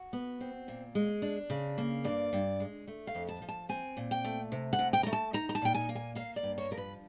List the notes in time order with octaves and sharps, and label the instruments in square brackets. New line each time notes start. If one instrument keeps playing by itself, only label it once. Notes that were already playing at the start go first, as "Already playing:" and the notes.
Already playing: [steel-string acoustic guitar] F#4
B3
C4
A#2
G#3
D4
C#3
A#3
G2 D5
G2
G#3
A3
F5
F2
A5
F3
A5
C4 G#5
A#2
G5
A3
C3
F#5
C3
G5
A3 A#5
A5
D#4 A#5
A#5
A5
A#2 G5
G#5
A#3
G#5
A#3 F5
D5
G2
C#5
F3 A#4
B4